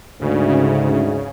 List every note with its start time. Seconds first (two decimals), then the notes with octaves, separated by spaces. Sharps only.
0.21 D2 G#2 C#3